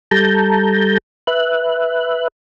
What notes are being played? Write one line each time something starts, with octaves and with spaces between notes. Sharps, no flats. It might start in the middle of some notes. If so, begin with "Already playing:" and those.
G3 A4 A5 A#5 G6
B4 E5 F#6